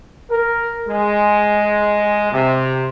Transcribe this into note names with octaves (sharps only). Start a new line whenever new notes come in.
A#4
G#3
C3